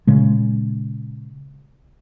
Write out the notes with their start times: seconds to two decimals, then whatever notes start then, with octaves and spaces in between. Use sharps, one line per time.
0.07 A#2 C#3 G#3